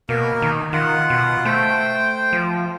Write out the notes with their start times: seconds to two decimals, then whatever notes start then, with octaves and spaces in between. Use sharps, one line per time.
0.09 B2 A#3 A#4
0.42 D#3
0.73 D#3 F4 F#5
1.10 B2
1.45 A3 C5 G5
2.33 F3